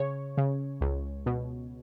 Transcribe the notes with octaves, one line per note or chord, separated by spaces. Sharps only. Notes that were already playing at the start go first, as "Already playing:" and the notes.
Already playing: C#3 C#5
C#3
C#2
B2